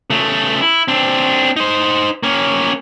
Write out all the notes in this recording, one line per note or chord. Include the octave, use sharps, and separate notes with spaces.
C#3 A3
E4
C4 D4
D#4 C5
A#3 C#4